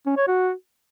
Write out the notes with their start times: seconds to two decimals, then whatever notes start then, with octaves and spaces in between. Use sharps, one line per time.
0.06 C#4
0.17 C#5
0.27 F#4